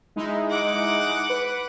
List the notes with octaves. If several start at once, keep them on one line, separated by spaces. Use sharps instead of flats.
G#3 D#4 E4
F#5 D6
B4